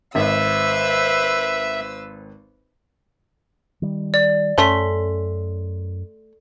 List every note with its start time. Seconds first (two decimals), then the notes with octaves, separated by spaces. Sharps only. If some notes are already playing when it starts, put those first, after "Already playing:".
0.15 G#1 B4 C5 E5 E6
3.82 D#3 G3
4.14 D5
4.58 F#2 A3 C#4 A4 C6 B6